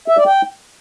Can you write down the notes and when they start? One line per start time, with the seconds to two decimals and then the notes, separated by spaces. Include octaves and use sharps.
0.08 E5
0.17 D5
0.26 G5